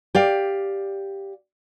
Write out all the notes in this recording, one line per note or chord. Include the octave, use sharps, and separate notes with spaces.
G4 D5 F5